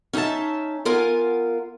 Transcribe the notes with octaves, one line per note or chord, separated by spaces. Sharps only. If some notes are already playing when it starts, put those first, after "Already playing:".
C#4 D#4 D#5 E5 A5
B3 F4 A#4 F5 G#5